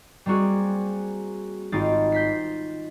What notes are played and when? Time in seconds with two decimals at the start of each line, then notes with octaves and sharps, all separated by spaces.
0.26 G3 A#3 C4 F#4 G#4
1.72 G#1 C4 D#4 F4 A6
2.12 G6 B6 C7